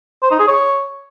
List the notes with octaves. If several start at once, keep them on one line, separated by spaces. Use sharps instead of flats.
C5
D#4
G#4
C#5